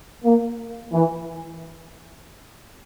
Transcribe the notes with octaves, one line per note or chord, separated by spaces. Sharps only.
A#3
E3